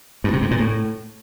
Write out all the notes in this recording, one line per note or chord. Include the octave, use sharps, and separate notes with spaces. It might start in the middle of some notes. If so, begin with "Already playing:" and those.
G2
C3
G#2
A#2
A2